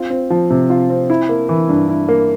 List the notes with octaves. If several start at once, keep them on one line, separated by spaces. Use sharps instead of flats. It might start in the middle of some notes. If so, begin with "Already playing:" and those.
Already playing: C4 F4
C4
F3
C3
F4
C4
E4
A#3
E3
G2
E4
A#3